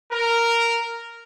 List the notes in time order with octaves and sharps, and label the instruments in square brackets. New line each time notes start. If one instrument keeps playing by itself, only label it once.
[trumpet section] A#4